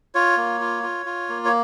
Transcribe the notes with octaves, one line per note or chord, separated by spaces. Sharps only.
F4 C#5
A#3
F4
F4
F4
A#3
C#5